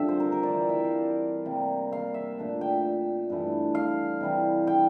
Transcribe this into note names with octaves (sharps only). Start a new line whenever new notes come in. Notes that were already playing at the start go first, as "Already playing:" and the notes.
Already playing: G2 D3 F3 C4 E5
C5
A#4
A#4
D5
E3 G3 C4
E5
F5
C3 G3 A#3
F5
E5
A#2 A3 D4
G5
G2 E3 A3
F5
C3 E3 G3
G5